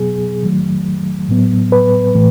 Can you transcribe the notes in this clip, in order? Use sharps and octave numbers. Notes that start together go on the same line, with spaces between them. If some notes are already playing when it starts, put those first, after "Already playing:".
Already playing: B2 F#3 B3 G#4
D#3 F#3 A3
A2 F#3 B3
B4
A2 E3 A3